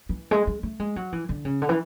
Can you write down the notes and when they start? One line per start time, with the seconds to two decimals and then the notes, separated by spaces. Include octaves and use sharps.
0.09 E3
0.31 G#3
0.47 G#3
0.63 A3
0.80 G#3
0.96 F#3
1.13 E3
1.29 D3
1.45 C#3
1.62 D3
1.69 E3